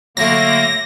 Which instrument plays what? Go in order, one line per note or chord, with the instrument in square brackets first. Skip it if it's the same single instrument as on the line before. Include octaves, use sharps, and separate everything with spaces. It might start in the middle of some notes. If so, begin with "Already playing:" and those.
[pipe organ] D3 A#3 [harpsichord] F#3 A3 [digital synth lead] A#6